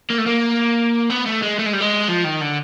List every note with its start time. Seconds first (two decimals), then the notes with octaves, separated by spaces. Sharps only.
0.10 A#3
0.18 A3
0.26 A#3
1.10 B3
1.26 A3
1.42 G#3
1.59 A3
1.66 G#3
1.73 G3
1.81 G#3
2.09 F3
2.25 D#3
2.41 D3